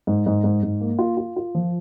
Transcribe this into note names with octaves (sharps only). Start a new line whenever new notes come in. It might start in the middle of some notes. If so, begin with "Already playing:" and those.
G#2
G#2
G#2
G#2
A#3
F4
F4
F4
F3